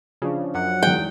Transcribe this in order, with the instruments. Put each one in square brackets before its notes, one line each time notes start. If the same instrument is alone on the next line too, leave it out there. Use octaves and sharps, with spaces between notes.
[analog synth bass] C#3 [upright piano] F3 D4
[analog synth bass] F#2 [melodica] F#5
[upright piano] E2 G#2 [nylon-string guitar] G5